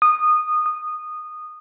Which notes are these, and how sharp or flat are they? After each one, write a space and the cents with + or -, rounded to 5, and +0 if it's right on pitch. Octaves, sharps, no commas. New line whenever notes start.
D#6 -20
D#6 -15